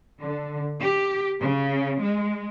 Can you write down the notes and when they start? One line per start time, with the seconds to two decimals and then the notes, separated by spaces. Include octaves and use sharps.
0.20 D3
0.80 G4
1.41 C#3
2.02 G#3